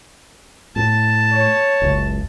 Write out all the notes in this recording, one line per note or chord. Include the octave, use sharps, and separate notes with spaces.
A2 A5
C#5
F#1 C#2